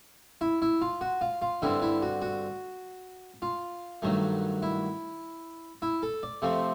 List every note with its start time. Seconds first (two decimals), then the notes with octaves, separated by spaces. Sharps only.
0.41 E4
0.62 E4
0.81 F4
1.01 F#4
1.21 F4
1.42 F4
1.62 G2 D3 G3 C4 E4
1.82 E4
2.02 F#4
2.22 F#4
3.42 F4
4.02 G2 D#3 F#3 A3
4.62 E4
5.82 E4
6.03 A4
6.23 D5
6.42 C3 F3 A3 C4